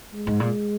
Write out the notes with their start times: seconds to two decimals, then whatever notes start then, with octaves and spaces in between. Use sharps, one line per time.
0.14 G#3
0.27 G#2
0.40 A#2